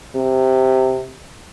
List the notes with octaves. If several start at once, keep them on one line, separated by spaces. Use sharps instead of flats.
C3